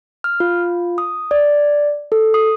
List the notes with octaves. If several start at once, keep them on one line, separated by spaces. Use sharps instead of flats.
F6
F4
D#6
D5
A4
D#6